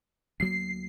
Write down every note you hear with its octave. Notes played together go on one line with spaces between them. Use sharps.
D2 F#3 A#3 C7